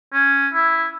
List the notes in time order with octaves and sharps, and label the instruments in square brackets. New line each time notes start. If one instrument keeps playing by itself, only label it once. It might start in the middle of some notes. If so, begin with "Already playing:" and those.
[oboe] C#4
E4